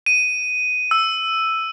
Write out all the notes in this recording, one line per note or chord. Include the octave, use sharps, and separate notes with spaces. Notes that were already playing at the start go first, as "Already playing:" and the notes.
D#7
E6